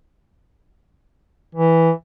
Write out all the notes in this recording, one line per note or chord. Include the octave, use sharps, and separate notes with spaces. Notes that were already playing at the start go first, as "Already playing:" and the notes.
E3